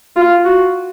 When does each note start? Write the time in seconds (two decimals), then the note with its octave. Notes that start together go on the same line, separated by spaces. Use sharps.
0.16 F4
0.45 F#4